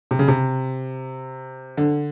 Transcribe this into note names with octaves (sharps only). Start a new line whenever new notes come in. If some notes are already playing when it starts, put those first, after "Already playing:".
C3
C#3
C3
D3